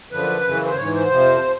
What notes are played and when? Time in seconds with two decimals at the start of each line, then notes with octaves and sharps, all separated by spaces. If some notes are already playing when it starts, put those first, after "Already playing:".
0.11 F#2 D3 F3 B4
0.43 F#2 C#3 E3
0.65 C5
0.77 G#2 E3 C#5
0.94 C5
1.09 F2 C3 F3